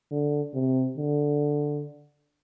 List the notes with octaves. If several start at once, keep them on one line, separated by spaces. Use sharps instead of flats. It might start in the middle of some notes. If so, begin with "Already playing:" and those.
D3
C3
D3